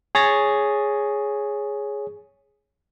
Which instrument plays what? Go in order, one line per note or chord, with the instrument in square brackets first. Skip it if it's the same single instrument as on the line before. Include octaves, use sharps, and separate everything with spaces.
[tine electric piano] G#4 C#5 A6 A#6